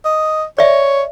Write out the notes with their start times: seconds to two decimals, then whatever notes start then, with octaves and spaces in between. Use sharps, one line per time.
0.05 D#5
0.58 C#5 D5 E5